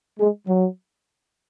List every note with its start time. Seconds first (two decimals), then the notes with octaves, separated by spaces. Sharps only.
0.19 G#3
0.47 F#3